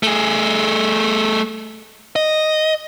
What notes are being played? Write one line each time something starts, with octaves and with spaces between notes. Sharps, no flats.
A3 G#4
D#5